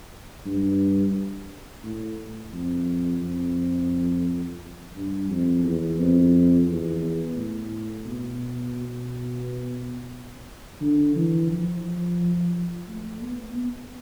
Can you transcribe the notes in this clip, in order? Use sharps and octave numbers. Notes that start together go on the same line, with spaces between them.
G2
A2
F2
F2
G2
F2
E2
F2
E2
A2
B2
B2
D3
E3
F3
A3
B3
B3